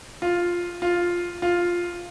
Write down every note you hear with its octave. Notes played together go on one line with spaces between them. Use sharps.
F4
F4
F4